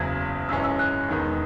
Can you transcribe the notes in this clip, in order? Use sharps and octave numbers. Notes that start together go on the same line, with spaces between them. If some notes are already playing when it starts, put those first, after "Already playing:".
Already playing: F#1 E2 C#3 F#3 G#6
G#1 F#2 E3 G#3 C#4 E6
E6
F#6
E1 E2 D#3 G#3 B3